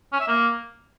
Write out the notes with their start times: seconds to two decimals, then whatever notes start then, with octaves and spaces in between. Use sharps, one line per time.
0.13 C#4
0.20 E5
0.28 A#3